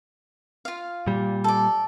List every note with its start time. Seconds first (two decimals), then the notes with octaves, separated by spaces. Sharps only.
0.65 F4 F5
1.07 A#2 G3
1.44 A4 D5